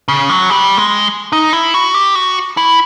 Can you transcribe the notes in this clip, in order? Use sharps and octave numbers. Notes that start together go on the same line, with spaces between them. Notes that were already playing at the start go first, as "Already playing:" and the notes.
C#3
F#3
G3
G#3
D#4
E4
F#4
G4
F#4
E4